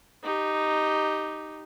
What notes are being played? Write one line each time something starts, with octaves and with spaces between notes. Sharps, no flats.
D#4 G4